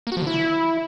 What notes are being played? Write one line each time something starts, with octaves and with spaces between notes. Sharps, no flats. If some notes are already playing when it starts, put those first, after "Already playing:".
A#3
F#4
F3
D3
E4